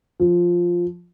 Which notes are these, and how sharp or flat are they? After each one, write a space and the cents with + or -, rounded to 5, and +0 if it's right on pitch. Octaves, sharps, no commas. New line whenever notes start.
F3 +5